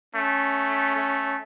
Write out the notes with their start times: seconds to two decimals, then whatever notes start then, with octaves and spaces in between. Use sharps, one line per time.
0.15 A3 C#4
0.96 A3